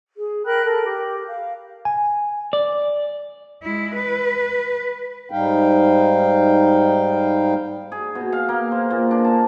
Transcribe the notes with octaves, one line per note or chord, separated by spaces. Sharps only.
G#4
A#4 G5 B5 F#6
A4 A#4
G4
F5
G#5
D5
G#3 E4
B4
G#2 G3 D#4 F5 G5
G#4
B2
F5
A#3
C5
A#2
D4
A5